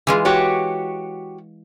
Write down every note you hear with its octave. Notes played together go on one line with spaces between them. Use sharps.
E3 G#3 F4
F#4 G4 C#5